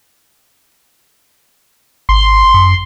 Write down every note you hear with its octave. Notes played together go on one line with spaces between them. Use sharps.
G#1 C6
F#2